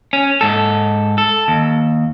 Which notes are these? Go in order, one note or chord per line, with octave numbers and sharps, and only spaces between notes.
C#4
G#2 A4
A4
D#2